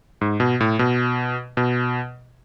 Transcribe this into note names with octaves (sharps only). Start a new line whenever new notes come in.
G#2
B2
A2
B2
B2